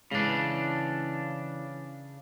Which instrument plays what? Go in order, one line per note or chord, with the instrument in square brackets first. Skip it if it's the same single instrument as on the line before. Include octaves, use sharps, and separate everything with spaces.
[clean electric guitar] C#3 D4 [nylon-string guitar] E3 G#3